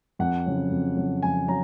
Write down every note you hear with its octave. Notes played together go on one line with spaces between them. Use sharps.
F2 F#5
C#3 F#3
F2
C#3 F#3
F2 G#5
F#3 A#5